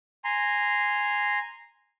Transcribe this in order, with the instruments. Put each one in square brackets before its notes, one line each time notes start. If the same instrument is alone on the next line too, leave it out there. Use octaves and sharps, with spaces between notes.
[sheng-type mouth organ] G#5 A#5 C6